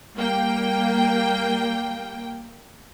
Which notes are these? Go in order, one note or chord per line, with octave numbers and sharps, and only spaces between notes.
G3 A#3 G5